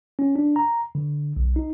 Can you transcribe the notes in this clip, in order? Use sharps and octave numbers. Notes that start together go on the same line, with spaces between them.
C#4
D4
A#5
D3
B1
D#4